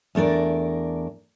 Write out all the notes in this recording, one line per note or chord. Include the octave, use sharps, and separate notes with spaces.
E2 A3 D4 A#4 D5